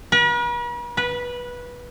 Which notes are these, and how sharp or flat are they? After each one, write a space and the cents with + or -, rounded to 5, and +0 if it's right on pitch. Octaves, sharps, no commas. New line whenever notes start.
B4 -45
B4 -15